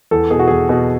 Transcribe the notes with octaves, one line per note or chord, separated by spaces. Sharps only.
E2 A4
B2 G#4
F#4
E2 G#4
B2